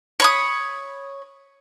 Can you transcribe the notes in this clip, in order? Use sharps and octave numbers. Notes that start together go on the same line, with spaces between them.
C#5 B5 D#6